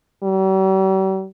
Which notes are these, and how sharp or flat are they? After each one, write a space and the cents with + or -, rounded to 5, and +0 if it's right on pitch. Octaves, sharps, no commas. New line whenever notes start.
G3 -45